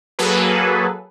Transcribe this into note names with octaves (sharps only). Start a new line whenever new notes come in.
F#3 A#3 G#4 A4 B4